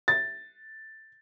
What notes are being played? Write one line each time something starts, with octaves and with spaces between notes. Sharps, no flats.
A6